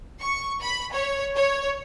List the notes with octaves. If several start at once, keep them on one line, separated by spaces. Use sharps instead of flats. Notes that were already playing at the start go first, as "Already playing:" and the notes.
C#6
B5
C#5
C#5